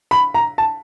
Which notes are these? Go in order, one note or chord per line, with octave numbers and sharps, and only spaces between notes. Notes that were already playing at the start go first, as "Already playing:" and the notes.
B5
A#5
A5